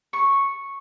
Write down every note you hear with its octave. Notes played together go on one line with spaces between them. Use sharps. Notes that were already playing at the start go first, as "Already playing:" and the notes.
C#6